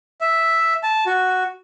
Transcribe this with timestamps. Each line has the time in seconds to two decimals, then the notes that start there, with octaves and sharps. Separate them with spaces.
0.21 E5
0.83 A5
1.06 F#4